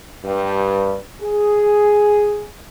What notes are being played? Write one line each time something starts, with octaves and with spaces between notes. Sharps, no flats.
G2
G#4